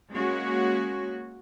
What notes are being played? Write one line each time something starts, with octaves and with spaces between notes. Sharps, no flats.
G#3 A#3 C#4 F#4